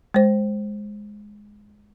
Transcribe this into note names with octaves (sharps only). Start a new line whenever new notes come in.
G#3 C5